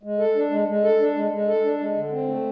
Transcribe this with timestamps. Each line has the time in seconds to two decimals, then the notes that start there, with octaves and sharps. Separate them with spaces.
0.03 G#3
0.19 A4
0.35 D4
0.51 G#3
0.68 G#3
0.84 A4
0.99 D4
1.16 G#3
1.31 G#3
1.48 A4
1.64 D4
1.79 G#3
1.95 D3
2.12 C4
2.28 A3